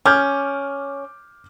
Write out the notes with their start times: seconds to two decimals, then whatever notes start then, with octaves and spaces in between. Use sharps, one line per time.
0.06 C#4 D6 F6 G6